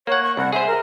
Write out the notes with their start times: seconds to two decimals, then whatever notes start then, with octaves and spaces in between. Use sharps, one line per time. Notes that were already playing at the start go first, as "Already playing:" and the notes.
0.07 A#3 C#5 F#5
0.23 C#6
0.37 C2 F#5
0.53 G#4 C5 E5
0.67 A#4